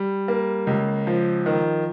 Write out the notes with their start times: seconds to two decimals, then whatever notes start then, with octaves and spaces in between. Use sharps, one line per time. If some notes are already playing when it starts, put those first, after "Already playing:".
Already playing: G3
0.28 A#3
0.67 C#2
1.07 F3
1.46 D#3